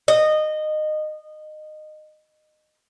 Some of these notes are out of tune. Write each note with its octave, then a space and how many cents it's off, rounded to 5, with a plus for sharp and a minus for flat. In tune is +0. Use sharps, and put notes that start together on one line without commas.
D#5 -20